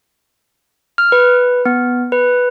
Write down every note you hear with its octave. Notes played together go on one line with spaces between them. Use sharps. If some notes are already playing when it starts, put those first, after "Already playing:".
F6
B4
B3
B4